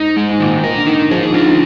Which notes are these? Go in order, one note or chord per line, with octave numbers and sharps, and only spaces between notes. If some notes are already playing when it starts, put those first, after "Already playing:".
Already playing: G#2 D#4
G#3
G#2
A#2 D#3
A#4
D3
D#4
F3 G#4
D#3
D3 F4
D#3